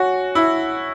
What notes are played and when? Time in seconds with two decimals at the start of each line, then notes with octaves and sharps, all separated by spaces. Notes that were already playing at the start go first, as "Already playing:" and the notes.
Already playing: F#4 C#5 G#5
0.35 E4